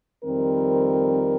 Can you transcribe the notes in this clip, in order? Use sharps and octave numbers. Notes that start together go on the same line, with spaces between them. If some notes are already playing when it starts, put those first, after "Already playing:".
F2 D#3 G3 C4 A#4